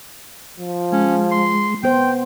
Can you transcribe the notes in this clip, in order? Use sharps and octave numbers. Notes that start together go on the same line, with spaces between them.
F3
G#3 C#4
C6
B3 C5 G5